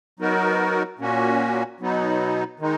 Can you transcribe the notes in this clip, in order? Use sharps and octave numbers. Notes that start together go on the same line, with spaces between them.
F#3 B3 D#4 F#4 A#4
A#2 A#3 C#4 F#4
B2 F#3 B3 D#4
D#3 G#3 D#4